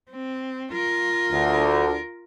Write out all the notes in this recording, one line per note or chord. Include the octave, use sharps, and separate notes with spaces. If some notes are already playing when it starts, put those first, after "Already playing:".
C4
F4 A#4
D2 D3